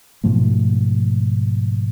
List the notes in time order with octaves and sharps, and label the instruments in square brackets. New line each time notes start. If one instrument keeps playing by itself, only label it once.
[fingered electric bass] G#2 B2 F3 A3